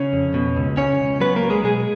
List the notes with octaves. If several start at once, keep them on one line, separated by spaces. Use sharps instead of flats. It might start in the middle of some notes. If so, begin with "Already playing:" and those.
Already playing: C#3 C#4 C#5
F2
B2
C#2
C#3 C#4 C#5
C#2
F#3 B3 B4
A#3 A#4
F#3
G#3 G#4
B2 G#3 G#4